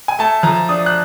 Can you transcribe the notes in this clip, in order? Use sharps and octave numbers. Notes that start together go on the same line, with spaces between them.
G#5
A3 A5
F3 A#5
D4 D#6
F#6